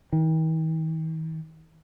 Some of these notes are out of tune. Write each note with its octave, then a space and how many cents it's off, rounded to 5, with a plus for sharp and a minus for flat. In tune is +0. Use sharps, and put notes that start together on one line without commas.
D#3 +45